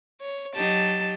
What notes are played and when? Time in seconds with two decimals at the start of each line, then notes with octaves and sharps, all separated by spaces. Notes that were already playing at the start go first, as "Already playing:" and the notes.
0.21 C#5
0.54 F#3 D#4 G4 A5